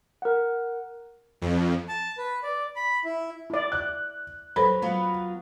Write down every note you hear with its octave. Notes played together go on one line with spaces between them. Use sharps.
A#4 F#5
F2
A5
B4
D5
B5
E4
E4 D5
F#6
F#3 A4 B4 C5 B5
F#3 B3 F4